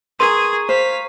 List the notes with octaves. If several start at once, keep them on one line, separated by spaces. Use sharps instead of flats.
G#4 A#4 B4 A#5 C6 C#6 D#7
C5 F5 B6